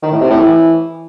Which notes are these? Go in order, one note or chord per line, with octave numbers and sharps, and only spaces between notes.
D#3
A2
C3
A2
E3